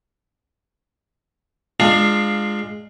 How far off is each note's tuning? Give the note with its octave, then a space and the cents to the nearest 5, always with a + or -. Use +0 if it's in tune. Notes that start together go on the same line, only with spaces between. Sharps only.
G#3 +0 D4 +30 F4 +0